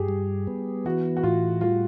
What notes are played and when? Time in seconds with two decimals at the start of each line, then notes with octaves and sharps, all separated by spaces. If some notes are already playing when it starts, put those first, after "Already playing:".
Already playing: G2 G4 G#4
0.09 G3
0.47 B3
0.86 E3 F#4
1.17 F#4
1.23 A2 F4
1.61 G3 F4